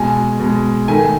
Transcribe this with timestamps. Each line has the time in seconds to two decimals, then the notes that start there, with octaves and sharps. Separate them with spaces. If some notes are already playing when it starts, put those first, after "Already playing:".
Already playing: B2 G#3 G#5
0.40 B2 G#3
0.88 D#3 A3 G#5